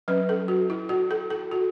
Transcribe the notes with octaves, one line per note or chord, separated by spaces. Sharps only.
F#3 C#4 B4
A4
F#4
E4
F#4
A4
A4
F#4